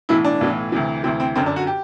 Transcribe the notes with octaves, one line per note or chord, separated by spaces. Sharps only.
B1 A2 E3 E4
D4
B1 A2 E3
D2 C3 E3
D2 C3 E3 C4
C4
G1 F#2 D3 C4
D4
F#4
G4